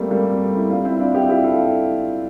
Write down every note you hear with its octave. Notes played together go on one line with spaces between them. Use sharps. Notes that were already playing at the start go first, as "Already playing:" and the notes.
Already playing: G3 A3 A#3 C4
G3 A#3
A3
C4 E4
D4 F4
C4 E4
D4 F4
E4 G4
F4
E4 G4
F4 A4